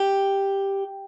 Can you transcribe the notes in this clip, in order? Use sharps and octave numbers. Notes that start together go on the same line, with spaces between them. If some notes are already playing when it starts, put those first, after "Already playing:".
Already playing: G4